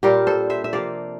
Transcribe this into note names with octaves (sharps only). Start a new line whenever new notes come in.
A#2 G3 D4 F4 G4 A#4
A4 C5
C5 E5
E5
C3 F3 A#3 D5 F5